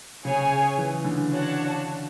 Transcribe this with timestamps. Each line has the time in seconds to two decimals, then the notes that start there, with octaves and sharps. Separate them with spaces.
0.25 C#3 G#4 C#5 G#5
0.78 E3
1.05 D3
1.31 D4 F#4 C#5 F#5 A5